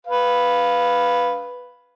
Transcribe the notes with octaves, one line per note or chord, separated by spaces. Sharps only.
B4 F5